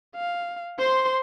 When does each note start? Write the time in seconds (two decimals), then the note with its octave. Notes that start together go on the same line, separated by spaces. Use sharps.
0.16 F5
0.79 C5 C6